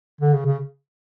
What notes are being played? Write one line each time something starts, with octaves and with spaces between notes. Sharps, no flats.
D3
C#3
C#3